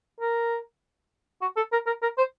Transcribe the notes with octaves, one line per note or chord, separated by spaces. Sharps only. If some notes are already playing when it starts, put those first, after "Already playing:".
A#4
F#4
A4
A#4
A#4
A#4
C5